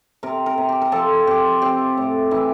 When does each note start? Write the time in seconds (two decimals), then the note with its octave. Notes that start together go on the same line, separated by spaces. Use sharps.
0.23 C3 A#4
0.46 A#4
0.58 C3
0.69 G4
0.82 A#4
0.92 F3 A4
1.27 C4 G4
1.62 C4 G4
1.97 A2
2.31 E3 E4